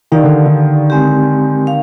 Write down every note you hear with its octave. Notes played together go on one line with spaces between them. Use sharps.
D#3 D#4 G4 D5 F5
D3
D3
G#3 C4 G4
F5